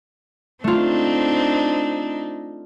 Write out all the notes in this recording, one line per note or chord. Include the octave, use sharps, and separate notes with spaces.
A3 C4 D4 D#4 F4